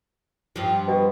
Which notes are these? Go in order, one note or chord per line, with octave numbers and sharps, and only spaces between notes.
G2 F3
B2